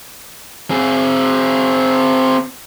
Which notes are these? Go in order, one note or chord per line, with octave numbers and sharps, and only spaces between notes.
C4 G#4